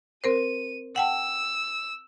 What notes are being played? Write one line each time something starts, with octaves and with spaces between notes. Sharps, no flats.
C4 A#4 C5 D#7
F#5 G5 A5 E6